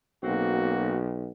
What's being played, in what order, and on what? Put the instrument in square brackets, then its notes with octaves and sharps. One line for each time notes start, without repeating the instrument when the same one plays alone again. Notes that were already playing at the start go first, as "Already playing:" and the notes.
[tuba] B1 [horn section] A#3 C4 F#4